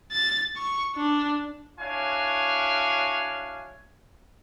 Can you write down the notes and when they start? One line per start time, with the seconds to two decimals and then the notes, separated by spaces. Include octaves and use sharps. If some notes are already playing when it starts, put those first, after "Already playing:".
0.12 A6
0.57 C#6
0.96 D4
1.79 D4 E4 F#4 C#5 F5 G#5